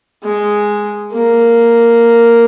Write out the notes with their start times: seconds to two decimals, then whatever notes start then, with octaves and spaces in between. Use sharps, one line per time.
0.23 G#3
1.12 A#3